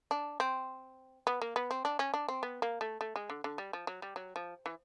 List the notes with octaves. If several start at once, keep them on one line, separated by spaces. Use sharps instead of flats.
D4
C4
B3
A#3
B3
C4
D4
C#4
D4
C4
B3
A#3
A3
A3
G#3
D3
D3
G3
F3
F#3
G3
F#3
F3
E3